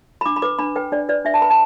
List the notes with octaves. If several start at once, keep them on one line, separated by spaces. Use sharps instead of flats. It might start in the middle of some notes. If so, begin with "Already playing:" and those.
B5
D4 D6
B5
B4 D6
D4 B5
B4 G5
D4 D5
B4 D5
D4 E5
A5
B4 B5
A5